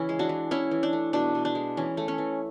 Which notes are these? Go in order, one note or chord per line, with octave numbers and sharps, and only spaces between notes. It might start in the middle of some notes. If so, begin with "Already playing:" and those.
Already playing: C#3 E3 C#4 E4
G#3
D4 F#4
E3
E3 C#4 E4
E3
D4
A3
B2 D4
B2
D4
G#3
E3 C#4
A3
C#4
E3